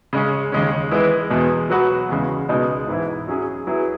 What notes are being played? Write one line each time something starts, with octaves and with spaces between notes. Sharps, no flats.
C#3 G#3 C#4
D#2 C#3 G#3 C#4
E3 G#3 B3 E4
E2 B2 G#3
F#3 B3 F#4 B4
E2 C#3 G#3
C#2 B2 G#3 D#4
G#2 E3 B3 E4
F#3 C#4 G#4
F#3 B3 E4 G#4